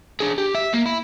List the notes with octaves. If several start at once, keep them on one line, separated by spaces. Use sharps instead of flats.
D4 G#4
G4
E5
A#3
E4